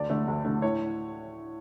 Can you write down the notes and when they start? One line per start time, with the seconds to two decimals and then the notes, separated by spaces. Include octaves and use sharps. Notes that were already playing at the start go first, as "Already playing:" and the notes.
Already playing: D2 D5
0.10 D3 A3
0.28 D2
0.45 D3 A3
0.62 A2 C#5